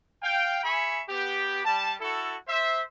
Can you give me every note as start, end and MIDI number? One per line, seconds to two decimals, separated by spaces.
0.23 0.63 77
0.23 0.63 79
0.64 1.01 68
0.64 1.01 76
0.64 1.01 80
0.64 1.01 83
0.64 1.01 85
1.09 1.64 59
1.09 1.64 67
1.65 1.95 55
1.65 1.95 81
2.01 2.35 64
2.01 2.35 66
2.01 2.35 69
2.48 2.81 72
2.48 2.81 76